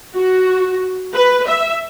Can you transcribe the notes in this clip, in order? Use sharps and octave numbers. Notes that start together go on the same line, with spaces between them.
F#4
B4
E5